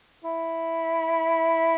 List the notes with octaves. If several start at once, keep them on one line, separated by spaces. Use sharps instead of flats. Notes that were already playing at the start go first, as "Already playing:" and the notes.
E4